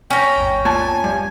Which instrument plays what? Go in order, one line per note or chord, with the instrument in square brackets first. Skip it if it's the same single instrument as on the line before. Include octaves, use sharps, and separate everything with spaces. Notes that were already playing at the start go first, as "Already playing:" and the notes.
[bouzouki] C#4 A#5 [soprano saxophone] G5 [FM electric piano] G#5
[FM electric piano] A1 E2 G#2
[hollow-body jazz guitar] A#2 A5 [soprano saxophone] G#5
[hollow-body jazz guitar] G2